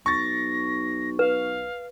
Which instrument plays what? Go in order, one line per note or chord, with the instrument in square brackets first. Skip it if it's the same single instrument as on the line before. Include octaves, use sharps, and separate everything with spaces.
[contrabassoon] B1 [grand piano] C#6 A6 [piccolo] A#6
[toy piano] B4 [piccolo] F5